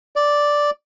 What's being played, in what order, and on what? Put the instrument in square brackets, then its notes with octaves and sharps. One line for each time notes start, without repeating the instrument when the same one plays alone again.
[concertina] D5